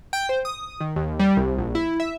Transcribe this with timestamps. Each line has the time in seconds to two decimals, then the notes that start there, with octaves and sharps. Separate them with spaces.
0.13 G5
0.29 C5
0.45 D#6
0.80 D#3
0.96 D#2
1.19 G3
1.37 C2
1.58 A#1
1.75 E4
2.00 E5